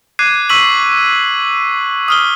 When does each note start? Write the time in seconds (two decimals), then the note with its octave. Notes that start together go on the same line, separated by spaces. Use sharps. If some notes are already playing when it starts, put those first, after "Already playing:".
0.19 D6 F#6 G#6 C7 D#7
0.49 C#6 E6 B6 D#7 F#7
2.08 D#6 F6 G7